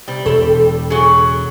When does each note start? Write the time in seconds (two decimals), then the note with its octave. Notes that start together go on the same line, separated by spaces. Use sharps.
0.08 C3 G3
0.26 E1 A4 C#5
0.90 C#3 F#3 G#4